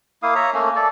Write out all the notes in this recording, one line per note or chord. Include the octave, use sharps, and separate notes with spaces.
A#3 E4 F5 D#6
C#5 E5 A#5
A3 A#3 C#4
A4 D5